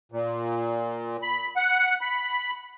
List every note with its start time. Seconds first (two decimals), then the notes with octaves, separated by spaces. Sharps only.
0.12 A#2
1.22 B5
1.56 F#5
2.01 B5